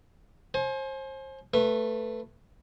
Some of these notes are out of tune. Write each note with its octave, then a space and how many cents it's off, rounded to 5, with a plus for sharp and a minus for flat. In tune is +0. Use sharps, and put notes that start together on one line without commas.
C5 +35 G#5 +35
A3 +15 B4 +0 C#6 -40